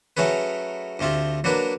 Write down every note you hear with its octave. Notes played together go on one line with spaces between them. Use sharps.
F#3 A3 C#4 G#4 B4
D2 A3 C4 F4 G4
F#3 A#3 D4 B4